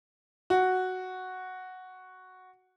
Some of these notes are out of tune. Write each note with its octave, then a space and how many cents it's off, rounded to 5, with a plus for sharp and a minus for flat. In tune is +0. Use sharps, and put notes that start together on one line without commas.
F#4 +0